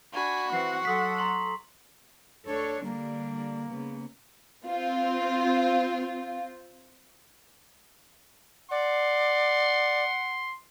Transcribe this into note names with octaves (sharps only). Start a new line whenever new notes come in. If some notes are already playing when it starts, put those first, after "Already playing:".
D4 F#4 G#5 B5
E3 C4 F#5 C#6 C7
F#3 A4 C6 D#6 B6
A#5 C6 F#7
D2 D4 A4 C#5
D3 G3 A#3 D4
C#3 B3
C4 F4
D5 F#5 C6